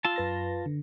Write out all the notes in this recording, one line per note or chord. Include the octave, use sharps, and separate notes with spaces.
F4 A5 E6
F#2 B4 A#6
D3